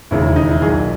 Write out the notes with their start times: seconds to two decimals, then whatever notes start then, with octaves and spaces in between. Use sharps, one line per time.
0.11 E1 D#2 C#3 E4
0.24 E4
0.36 D#4
0.49 E4
0.62 B1 A#2 G#4